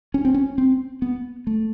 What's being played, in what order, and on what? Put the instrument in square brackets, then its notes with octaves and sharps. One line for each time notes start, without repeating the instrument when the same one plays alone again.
[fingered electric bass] C#4
C4
C#4
C4
B3
A3